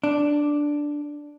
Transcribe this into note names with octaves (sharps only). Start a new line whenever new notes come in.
D4